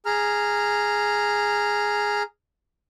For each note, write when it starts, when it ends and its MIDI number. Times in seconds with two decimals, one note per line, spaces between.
0.06 2.23 68
0.06 2.23 82
0.06 2.23 89